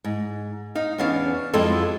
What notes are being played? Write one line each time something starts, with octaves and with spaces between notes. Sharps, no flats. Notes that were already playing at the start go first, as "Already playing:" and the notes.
G#2
D#4 F5
E2 B3 C#4 D4 F5
F2 F#3 G#3 E4 F4 A4